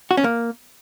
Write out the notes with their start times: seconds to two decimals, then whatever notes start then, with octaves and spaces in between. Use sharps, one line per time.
0.11 F#4
0.17 C#4
0.24 A#3